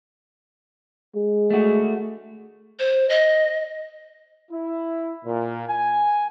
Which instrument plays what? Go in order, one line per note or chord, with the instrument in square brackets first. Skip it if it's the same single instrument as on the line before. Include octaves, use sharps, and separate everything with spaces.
[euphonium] G#3
[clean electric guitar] A3 F#4
[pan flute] C5
D#5
[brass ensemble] E4
A#2
G#5